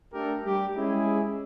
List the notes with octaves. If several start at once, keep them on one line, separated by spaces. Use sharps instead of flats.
A3 D4 G4 A4 A#4
G3 G4
G#3 C#4 E4 G#4